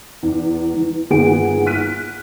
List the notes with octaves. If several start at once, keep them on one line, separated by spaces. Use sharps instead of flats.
E2
E3
G1 D#3 A#3 G#4 F#5 D7
F6 F#6 B6 D#7